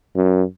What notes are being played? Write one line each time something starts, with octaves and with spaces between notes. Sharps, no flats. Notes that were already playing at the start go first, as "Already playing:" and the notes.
F#2